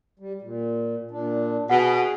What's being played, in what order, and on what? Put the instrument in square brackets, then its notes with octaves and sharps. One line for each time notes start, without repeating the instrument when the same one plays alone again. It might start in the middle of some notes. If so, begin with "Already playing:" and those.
[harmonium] G3
A#2
A#2 D4
[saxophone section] B2 [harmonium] G#4 [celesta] F#5